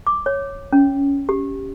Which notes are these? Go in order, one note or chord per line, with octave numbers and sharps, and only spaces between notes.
D6
C#5
C#4
G4